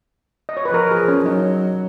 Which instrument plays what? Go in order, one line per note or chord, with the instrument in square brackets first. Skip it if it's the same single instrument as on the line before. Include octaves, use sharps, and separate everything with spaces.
[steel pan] D#5
C#5
B4
[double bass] F3 [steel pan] A#4
[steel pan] G#4
C#4
[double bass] F#3 [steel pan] D#4